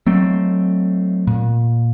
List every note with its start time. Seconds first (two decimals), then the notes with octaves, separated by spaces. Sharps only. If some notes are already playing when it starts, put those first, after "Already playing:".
0.07 F#3 A3 C4
1.27 A#2